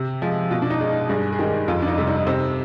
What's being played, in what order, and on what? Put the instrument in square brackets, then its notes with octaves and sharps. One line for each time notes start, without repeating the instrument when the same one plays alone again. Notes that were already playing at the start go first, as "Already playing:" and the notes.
Already playing: [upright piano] C3 G4
F3 G#3
B2 F4
D4
D#4
G#3
G2 G#4
G#4
D#3 G#3 G4
F2 F4
D4
D#4
C3 G3
D#4
C3 C4